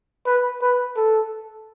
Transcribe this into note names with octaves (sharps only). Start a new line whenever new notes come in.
B4
B4
A4